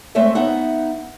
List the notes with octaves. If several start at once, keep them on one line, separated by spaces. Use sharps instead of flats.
G#3 A3 C4 C#5 E5
B3 D#4 E5 F#5